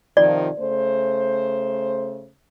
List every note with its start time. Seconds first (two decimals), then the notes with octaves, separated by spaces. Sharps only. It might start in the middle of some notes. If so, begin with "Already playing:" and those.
0.17 C3 D#3 F3 D5
0.59 C#3 A3 C5